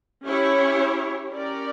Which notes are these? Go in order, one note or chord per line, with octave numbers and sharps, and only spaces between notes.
C#4 E4 G4 C#5
C#4 G4 A#4 D5